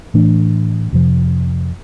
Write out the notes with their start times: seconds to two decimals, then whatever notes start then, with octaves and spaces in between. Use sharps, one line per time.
0.14 A2 E3 A3 D4
0.92 F2 C3 F3